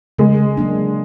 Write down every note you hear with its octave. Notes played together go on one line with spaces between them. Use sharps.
C#3 G#3
F#3 A#3 D4